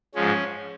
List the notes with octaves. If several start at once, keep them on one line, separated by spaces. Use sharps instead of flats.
G#2 F3 G#3 C#4